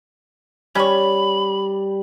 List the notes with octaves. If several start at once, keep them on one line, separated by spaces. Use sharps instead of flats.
G3 C#4 C#5 B5